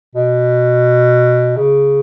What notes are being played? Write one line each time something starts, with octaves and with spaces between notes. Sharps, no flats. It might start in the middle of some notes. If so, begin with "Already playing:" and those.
B2
C#3